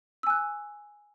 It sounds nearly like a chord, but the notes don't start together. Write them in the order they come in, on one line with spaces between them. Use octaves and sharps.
E6 G#5 F#6